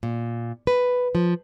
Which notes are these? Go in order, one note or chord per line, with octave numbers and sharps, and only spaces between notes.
A#2
B4
F3